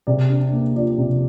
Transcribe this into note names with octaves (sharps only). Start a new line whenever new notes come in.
C3 D5
D4
A#3
F3 D5
C3